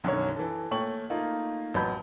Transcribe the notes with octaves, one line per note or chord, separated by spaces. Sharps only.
B1 F#2 D3 D#3 C#4 C#5
E3 A4
A#2 A3 C#5 G5 C#6 F#7
A3 A#3 D#4 F4
A1 F#3 B3 A5 B5 G6